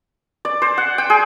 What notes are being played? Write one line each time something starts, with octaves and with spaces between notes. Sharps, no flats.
D5
C5
F#5
G5
G#4